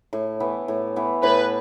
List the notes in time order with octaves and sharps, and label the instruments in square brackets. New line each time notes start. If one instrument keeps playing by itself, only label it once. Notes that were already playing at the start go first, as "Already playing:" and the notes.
[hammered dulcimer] A2
E3 B3
A2
E3 B3
[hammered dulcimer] A2 [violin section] B4